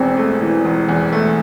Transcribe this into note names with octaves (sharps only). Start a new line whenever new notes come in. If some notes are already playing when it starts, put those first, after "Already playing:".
Already playing: E1 E2 C4
A3
E3
E1
E2
A3